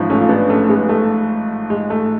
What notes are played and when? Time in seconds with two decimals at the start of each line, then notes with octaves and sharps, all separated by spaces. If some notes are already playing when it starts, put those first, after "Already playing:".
Already playing: A1 G#2 F3
0.10 A3 C#4
0.20 F4
0.29 B3 D4
0.50 A3 C#4
0.69 G#3 B3
0.89 A3
1.70 G#3
1.90 A3